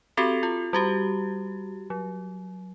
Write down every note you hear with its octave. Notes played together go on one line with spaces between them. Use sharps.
C4 F#4 G4 A4 F7
F4
G3 F#4 G4
F#3